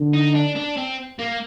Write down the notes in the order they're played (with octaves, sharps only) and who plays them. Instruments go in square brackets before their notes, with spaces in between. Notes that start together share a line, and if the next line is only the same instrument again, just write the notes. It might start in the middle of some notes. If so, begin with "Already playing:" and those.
Already playing: [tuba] D3
[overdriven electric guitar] D#4
D4
D4
C4
A#3